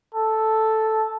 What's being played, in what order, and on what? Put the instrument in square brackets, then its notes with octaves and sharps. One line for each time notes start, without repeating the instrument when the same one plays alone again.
[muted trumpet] A4